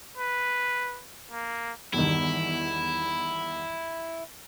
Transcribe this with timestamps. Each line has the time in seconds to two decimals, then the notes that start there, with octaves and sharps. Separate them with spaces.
0.18 B4
1.31 A#3
1.94 E2 G2 D#3 E4